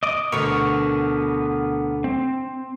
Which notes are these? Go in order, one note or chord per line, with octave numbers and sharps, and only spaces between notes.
D#5 D6
D2 B2 D3 B3 A#4 C#6
C4